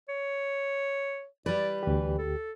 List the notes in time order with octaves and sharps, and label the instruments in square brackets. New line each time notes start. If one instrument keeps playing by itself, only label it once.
[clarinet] C#5
[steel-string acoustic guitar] G3 B4 [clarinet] D5
[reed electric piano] D2 G4 [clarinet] E3
[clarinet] A4